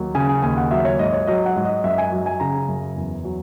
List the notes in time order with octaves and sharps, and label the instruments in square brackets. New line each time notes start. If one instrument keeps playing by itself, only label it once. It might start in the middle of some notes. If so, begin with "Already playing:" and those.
Already playing: [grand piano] D#2 F#3
C#3 G#5
G#5
D#2 G#5
F#5
F#3 E5
C#5
G#2 D#5
C#5
F#3 D#5
F#5
G#2
D#5
F#2 E5
G#5
F#3
G#5
C#3 A#5
F#2
E2
F#3